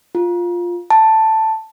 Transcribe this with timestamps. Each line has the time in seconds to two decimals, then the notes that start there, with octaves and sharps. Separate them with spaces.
0.15 F4
0.90 A5